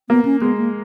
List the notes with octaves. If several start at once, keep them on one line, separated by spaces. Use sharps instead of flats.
A#3 B3
C#4
G#3 B3
A#3